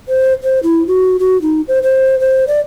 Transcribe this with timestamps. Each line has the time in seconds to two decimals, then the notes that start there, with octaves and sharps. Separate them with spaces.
0.09 C5
0.43 C5
0.63 E4
0.87 F#4
1.19 F#4
1.42 D#4
1.68 C5
1.83 C5
2.20 C5
2.48 D5